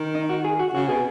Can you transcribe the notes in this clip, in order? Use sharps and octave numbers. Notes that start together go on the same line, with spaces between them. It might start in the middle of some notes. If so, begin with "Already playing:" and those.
Already playing: D#3
D#4
F#4
G#4
F#4
C#3 F#4
B2 G#4